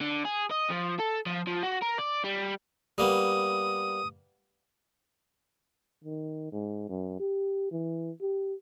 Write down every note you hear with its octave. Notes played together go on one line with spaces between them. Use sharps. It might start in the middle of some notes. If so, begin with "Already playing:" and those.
D3
G#4
D#5
F3
A4
F3
F3
F#4
A#4
D5
G3
G3 A#3 B3 D#6
D#3
G#2
F#2
G4
E3
G4